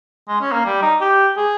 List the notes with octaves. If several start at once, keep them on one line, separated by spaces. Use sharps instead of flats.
G#3
C#4
A#3
G3
D#4
G4
G#4